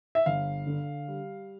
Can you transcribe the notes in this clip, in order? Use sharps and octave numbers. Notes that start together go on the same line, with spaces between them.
E5
G1 F5
D3
G3